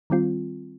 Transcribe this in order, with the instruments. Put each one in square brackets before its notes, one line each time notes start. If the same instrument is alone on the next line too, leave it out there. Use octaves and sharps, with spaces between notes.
[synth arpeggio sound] D#3 G3 C4 F4